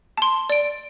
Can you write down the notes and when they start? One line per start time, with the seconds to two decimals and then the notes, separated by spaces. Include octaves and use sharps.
0.17 A5 C6
0.50 D5 D7